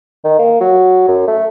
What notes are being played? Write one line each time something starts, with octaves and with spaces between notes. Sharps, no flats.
D#3
A#3
F#3
F#2
A3